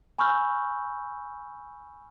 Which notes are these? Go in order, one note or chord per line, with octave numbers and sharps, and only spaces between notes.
G#5 B5 C#6 E6 F6 G6